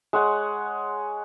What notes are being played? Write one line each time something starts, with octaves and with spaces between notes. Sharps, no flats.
G#3 C#5 F#5